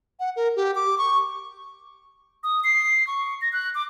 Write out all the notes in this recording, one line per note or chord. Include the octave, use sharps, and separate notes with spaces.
F#5
A#4
G4
D6
C#6
D#6
C7
C#6
A#6
F#6
D6